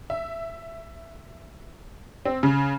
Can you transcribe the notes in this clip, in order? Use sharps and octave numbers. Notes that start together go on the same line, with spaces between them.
E5
C4
C#3